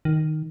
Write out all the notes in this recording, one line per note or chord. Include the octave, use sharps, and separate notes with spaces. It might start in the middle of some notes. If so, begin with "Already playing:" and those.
D#3